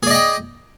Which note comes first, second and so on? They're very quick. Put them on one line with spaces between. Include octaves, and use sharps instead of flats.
G#4 D5 D#5 G5